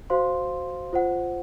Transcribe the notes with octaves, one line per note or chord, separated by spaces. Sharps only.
F#4 C5 F5 C6
F4 C5 F#5